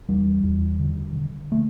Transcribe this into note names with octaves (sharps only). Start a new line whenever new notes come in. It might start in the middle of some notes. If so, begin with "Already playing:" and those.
E2 G3
E2
D3
D3
A3